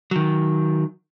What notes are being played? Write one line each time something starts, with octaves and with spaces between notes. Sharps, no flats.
D#3 F#3